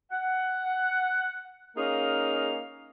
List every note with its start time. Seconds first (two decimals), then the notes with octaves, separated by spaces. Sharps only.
0.11 F#5
1.77 A#3 C#4 D#4 G#4 F5